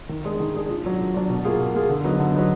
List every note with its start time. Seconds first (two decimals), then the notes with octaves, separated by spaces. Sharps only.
0.09 D#3
0.24 G#3 D4 G#4
0.40 D#3
0.54 G#3 D4 G#4
0.69 A#2
0.84 F#3 D4
0.99 A#2
1.14 F#3 D4
1.29 B2
1.45 A#3 F4 G#4
1.59 B2
1.74 A#3 F4 G#4
1.89 D3
2.04 F#3 B3 D#4
2.19 D3
2.35 F#3 B3 D#4